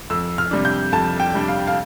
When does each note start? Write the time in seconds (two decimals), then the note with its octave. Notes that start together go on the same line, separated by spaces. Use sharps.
0.10 F2 E6
0.38 F6
0.51 C3 G3 D4
0.65 G6
0.92 F2 A5
1.20 G5
1.34 C3 G3 D4
1.48 F5
1.67 F5